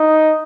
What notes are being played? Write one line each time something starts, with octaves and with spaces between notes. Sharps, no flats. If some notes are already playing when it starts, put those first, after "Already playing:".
Already playing: D#4